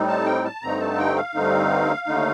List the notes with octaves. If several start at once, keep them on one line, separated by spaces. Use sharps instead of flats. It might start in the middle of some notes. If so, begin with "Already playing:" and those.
Already playing: A2 G3 C4 D#4
A5
G5
A5
G2 D3 A3 C4 D#4 A#5
A5
G5
F5
G2 D3 A3 C4 D#4
D#2 D3 A3 D#4